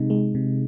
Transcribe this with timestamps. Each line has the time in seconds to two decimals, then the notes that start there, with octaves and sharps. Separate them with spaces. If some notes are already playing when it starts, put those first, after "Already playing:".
Already playing: C3 G#3 D#4
0.10 G#3
0.35 C3